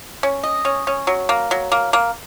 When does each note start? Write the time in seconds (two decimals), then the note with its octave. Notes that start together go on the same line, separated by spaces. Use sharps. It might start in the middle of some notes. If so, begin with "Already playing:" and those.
0.23 C#4
0.43 D#5
0.65 C#4
0.87 C#4
1.07 F#3
1.29 A#3
1.51 F#3
1.72 A#3
1.93 A#3